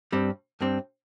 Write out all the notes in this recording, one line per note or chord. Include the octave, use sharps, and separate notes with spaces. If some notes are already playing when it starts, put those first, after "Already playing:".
G2 G3 C4
G2 G3 C4